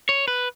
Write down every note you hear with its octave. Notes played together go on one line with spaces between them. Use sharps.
C#5
B4